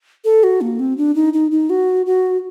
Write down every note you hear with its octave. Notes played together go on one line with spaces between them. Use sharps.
A4
F#4
A#3
C4
D4
D#4
D#4
D#4
F#4
F#4